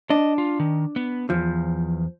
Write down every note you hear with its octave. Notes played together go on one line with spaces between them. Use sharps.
D4 D#5
F4
D#3
B3
E2 F3